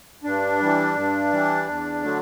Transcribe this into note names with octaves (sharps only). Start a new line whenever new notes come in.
G2 D4
E3 G3
G2
E3 G3
E2
D3 F#3 A3